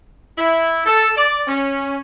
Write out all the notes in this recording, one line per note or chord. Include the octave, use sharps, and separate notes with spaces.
E4
A4
D5
C#4